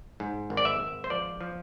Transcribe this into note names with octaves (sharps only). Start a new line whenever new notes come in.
G#2
G#1
D5
E5
G#1
C5
F3 D5
F3